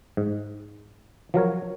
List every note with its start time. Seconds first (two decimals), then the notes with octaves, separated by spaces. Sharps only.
0.17 G#2
1.34 F3 F#3 A#4 C#5